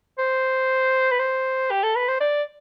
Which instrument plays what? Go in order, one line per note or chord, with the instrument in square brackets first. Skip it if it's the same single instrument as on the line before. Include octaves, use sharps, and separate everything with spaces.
[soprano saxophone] C5
B4
C5
G4
A4
B4
C5
D5